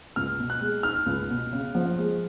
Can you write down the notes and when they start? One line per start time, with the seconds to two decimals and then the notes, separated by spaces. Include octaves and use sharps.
0.16 C#2 F6
0.39 B2
0.50 F#6
0.61 G#3
0.83 D#4 F6
1.06 C#2
1.29 B2
1.53 C#3
1.75 F3
1.98 G#3